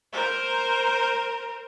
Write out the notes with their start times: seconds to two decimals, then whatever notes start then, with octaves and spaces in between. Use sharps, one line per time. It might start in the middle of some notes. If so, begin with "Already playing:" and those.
0.13 A#4 C5